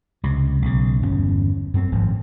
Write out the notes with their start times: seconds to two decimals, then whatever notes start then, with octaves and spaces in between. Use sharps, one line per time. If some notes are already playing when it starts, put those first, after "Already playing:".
0.23 C#2 C3
0.62 B1 C#3
1.03 G1 E2 C#4
1.74 F#2 C4
1.92 D#1 G#1 G#2 F3